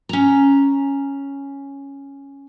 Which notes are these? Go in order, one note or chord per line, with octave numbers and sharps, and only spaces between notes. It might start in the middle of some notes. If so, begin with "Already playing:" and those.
C#4 A#5